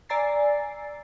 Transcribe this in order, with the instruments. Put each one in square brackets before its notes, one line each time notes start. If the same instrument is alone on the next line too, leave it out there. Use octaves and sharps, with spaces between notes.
[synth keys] D5 G#5 A#5 E6 A6 C7